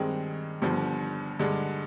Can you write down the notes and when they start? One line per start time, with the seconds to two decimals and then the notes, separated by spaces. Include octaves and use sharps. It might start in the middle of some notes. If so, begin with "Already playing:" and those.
Already playing: G2 D#3 G#3 C4
0.62 G1 G2 D3 F3
1.39 G2 D3 G#3